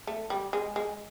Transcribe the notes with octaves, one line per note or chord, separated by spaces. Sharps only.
A3
G3
G#3
G#3